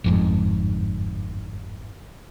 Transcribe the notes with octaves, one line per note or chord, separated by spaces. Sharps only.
G1 F2 G#2